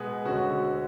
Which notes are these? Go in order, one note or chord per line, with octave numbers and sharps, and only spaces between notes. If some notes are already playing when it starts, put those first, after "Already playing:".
Already playing: B2 G#3 B3
D2 D3 G#3 C#4 F#4